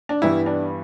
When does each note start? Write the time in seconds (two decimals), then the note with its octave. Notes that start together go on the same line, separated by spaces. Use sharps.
0.09 D4
0.22 G2 E3 G3 B3 E4
0.46 D4